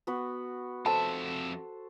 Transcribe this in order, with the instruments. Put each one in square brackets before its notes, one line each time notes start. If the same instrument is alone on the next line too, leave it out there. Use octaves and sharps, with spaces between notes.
[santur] B3 F#4 B4
[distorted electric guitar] F2 E5 [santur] A4 C5 [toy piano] A5